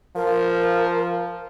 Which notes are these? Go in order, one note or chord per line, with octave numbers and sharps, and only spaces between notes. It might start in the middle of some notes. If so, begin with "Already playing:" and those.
F3 A#4